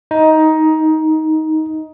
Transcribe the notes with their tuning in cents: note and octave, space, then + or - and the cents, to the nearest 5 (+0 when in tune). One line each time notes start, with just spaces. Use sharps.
D#4 +15